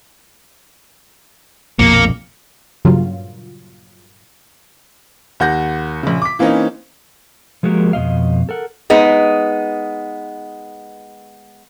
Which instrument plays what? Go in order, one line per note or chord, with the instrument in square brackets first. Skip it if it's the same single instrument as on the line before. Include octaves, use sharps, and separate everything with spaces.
[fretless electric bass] A#1 F2 B2 [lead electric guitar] A#3 [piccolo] C#7
[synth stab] G2 A#2 C#3 F#3 F4
[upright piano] D#2 F#5 G6 A#6
A#1 C#3
D6 B6
E3 A#3 C4 C#4 D#4
[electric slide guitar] F3 G#3 A#3 F#4 G4 A#4
F2 B2 D#5 F5
A4 A#4 F#5
[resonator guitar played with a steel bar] G#3 B3 D#4